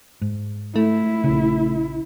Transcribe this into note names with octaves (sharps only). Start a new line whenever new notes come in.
G#2
A3 E4
A#1 C#3